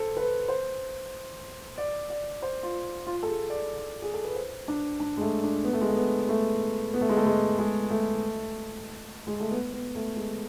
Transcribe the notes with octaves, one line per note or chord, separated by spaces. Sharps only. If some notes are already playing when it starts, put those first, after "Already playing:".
Already playing: A4 C5
B4
C5
D5
D5
C5
F4
F4
A4
G#4
D5
G#4
A4
B4
C5
D4
D4
G#3
A3
D4
B3
A3
G#3
A3
B3
A3
B3
A3
G#3
A3
G#3
G#3
A3
G#3
A3
B3
B3
A3
G#3